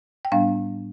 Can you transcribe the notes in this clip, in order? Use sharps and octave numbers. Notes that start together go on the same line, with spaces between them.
G5
A2 G3 B3 D4 F5